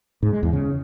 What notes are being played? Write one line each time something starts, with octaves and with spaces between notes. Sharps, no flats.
G#2
G#3
E2
C#3